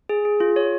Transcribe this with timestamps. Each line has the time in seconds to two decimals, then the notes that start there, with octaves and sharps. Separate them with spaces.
0.09 G#4
0.25 G#4
0.40 F4
0.56 C#5